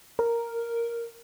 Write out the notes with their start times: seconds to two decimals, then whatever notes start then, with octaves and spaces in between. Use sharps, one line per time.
0.19 A#4